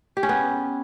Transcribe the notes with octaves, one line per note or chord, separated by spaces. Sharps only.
G4
C#4
B3